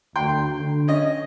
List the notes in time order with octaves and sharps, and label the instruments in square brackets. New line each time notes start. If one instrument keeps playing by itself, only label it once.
[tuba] D2 [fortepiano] G5 C6
[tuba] D3
[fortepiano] C#4 D#5